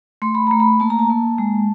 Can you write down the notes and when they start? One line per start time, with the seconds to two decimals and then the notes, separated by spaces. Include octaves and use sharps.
0.22 A3 C6
0.35 B5
0.47 A3 A#5
0.60 B5
0.80 A#3 A5
0.90 A#5
0.99 A5
1.10 A#3
1.38 G#3